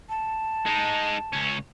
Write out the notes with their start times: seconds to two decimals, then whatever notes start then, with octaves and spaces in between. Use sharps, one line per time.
0.09 A5
0.66 G#3 D#4
1.33 C#2 C#4